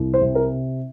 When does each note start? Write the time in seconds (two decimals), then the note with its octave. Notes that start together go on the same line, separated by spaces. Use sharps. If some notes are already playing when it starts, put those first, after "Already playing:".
Already playing: C2
0.14 C5
0.21 C3
0.35 A#4